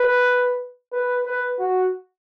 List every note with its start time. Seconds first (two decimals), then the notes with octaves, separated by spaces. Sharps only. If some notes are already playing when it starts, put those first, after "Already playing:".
Already playing: B4
0.93 B4
1.26 B4
1.60 F#4